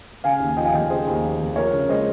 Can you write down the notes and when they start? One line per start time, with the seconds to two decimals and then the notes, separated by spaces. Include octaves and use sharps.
0.24 C#3 F5 G#5
0.40 D#2
0.57 F3 D#5 G5
0.65 F5 G#5
0.73 F1 D#5 G5
0.90 C#3 G#4 C5
1.07 D#2
1.23 F3
1.39 F1
1.56 F3 A#4 C#5
1.73 C#3
1.89 G#3 C5 D#5